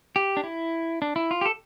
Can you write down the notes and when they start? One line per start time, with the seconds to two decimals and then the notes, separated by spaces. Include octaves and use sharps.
0.16 G4
0.37 D4
0.44 E4
1.02 D4
1.16 E4
1.31 F4
1.41 G4
1.46 A4